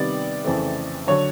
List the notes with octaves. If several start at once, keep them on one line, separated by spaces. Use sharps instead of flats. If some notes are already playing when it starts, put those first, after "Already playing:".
Already playing: C3 D#3 G3 B3 D5
F2 C#3 E3 A3 C4
D3 F#3 C#5